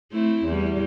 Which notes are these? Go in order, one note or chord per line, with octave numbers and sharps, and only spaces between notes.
A3 C4 E4
E2 G3